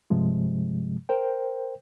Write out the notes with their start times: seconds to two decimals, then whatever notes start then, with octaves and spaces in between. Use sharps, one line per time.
0.10 G2 C3 F3 G#3
1.09 A#4 C5 G5